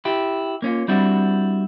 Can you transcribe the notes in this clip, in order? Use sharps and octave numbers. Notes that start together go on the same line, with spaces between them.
E4 G4
A#3 C#4 F4
G3 C4 D4 E4 F#4